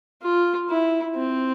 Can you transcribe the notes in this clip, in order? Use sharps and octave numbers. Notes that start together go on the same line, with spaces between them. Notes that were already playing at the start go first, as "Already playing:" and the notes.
F4
E4
C4